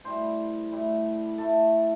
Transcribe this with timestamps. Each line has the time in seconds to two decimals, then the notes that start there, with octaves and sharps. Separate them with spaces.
0.04 A2 G3 C5
0.71 A2 G3
1.38 A2 A3 A4